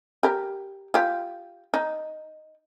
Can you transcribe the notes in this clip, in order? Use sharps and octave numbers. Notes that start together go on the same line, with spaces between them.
G4 A#4
F4 G4
D#4